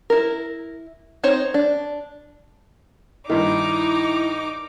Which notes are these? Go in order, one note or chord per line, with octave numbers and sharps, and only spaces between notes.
E4 A#4
C4 D#4 C5 C#5
D4
G2 D#3 D#4 E4 D6